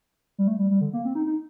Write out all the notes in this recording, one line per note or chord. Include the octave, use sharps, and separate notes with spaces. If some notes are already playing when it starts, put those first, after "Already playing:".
G3
A3
G3
G3
D3
A#3
C4
D#4
D#4